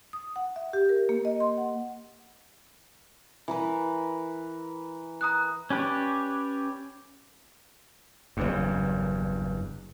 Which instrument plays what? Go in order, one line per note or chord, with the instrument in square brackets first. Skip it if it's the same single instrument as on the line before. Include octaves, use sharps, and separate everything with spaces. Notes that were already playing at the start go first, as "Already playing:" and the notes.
[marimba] D#6
F#5
E5
G4
A#4
A#3
D#5
C6
F#5
[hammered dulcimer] E3 A#4 B4
[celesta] A#5 D#6 F#6
[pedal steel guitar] C#4 G4 B4 C#5 D5
[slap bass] F#1 E2 G2